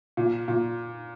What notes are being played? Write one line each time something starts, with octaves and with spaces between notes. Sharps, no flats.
A#2
A#2